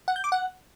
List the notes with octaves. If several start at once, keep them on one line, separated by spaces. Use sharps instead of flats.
F#5
G6
D6
F#5